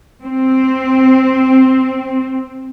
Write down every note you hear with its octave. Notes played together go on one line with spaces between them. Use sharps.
C4